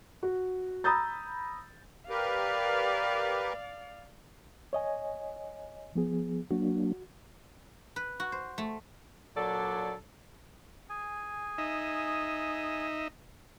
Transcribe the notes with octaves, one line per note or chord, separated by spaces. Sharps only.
F#4
A#5 B5 D#6 E6 G6 A6
G4 A#4 B4 D5 F5
C#5 D#5 G#5
F3 B3 G#4
F#3 A#3 D4 F#4
B4
F#4
C5
A3
A#2 F#3 D4 A4 D5
G#4 G#5
D#4 D#5 E5